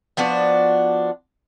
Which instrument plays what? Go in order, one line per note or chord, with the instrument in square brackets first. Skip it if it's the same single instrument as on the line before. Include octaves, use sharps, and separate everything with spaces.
[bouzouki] F3 B3 D4 F#4